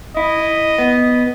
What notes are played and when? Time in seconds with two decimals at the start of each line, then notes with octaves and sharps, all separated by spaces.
0.17 E4 D#5
0.78 B3